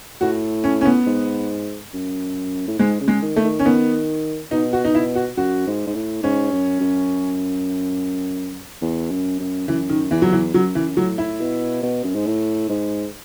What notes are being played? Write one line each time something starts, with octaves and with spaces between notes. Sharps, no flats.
A2 F#4
C#4
C#4
B3
G#2
F#2
A2
G#2 G#3
C#3
G#3
D#3
A3
D#3
C#4
D#3 B3
B2 D#4
F#4
D#4
E4
F#4
F#2 F#4
G#2
G#2
A2
G#2 C#4
F#2
F#2
E2
F#2
F#2
F#2 E3
D#3
E2 E3
F#3
E3
F#2 F#3
F#2 E3
A2 F#3
A2 E4
B2
B2
F#2
G#2
A2
G#2